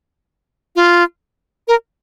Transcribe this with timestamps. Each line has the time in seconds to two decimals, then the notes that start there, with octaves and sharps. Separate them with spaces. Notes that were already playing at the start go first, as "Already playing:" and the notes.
0.76 F4
1.68 A#4